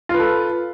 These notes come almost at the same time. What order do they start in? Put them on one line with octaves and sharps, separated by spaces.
F4 B4 A4